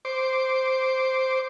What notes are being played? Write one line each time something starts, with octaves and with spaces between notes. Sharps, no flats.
C5 D6